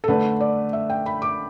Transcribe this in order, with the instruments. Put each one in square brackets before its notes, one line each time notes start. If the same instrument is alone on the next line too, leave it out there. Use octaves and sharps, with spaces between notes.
[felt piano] A4
D3 A3 D4 B4
D5
E5
G5
B5
D6